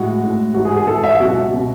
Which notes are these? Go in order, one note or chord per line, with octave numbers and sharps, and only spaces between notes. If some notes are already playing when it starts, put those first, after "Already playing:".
Already playing: A2 G#3 F#4
A2 G#3
G#2 E3 G#3 F#4
G#4
G#4
G#2 E3 G#3 A4
E5
C#2 B2 F#3 F#4
B2 F#3